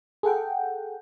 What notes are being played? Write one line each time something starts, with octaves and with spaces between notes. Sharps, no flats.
G#4 A4 F#5 G5